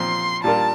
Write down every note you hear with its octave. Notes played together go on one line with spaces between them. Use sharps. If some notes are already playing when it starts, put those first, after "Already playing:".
Already playing: A#2 F3 C4 C6
A#2 G3 D4 F4 A#4 A5